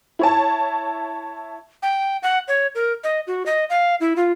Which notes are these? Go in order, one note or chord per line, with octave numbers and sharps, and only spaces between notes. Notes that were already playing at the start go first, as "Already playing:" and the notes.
E4 C#5 A5
G5
F#5
C#5
A#4
D#5
F#4
D#5
F5
E4
F4